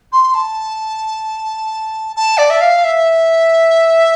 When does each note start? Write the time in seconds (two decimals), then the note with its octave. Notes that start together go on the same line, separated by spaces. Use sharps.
0.12 C6
0.34 A5
2.16 A5
2.38 D5
2.50 E5
2.61 F5
2.84 E5